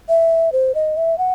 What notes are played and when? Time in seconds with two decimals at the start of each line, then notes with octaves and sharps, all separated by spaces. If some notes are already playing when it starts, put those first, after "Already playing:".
0.09 E5
0.52 C5
0.75 D#5
0.97 E5
1.18 F#5